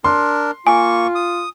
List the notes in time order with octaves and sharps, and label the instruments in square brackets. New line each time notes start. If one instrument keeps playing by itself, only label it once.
[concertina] D4 A#4 [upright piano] C6
[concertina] A#3 C#6 [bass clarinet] F4 [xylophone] G#5
[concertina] D#6